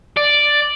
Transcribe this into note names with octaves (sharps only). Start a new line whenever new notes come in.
D5